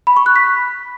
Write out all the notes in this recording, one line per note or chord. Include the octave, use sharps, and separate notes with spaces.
B5
C#6
F#6
B6